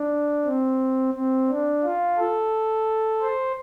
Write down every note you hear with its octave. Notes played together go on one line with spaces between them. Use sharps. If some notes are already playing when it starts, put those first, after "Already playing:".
Already playing: D4
C4
C4
D4
F4
A4
C5